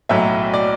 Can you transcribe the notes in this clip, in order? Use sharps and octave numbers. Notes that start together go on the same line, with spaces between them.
B1 A2 F#3 E5
D5